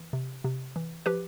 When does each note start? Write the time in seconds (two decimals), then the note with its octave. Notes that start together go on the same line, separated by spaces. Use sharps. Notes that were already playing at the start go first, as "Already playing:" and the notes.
Already playing: E3
0.13 C3
0.44 C3
0.76 E3
1.06 F3 G4 B4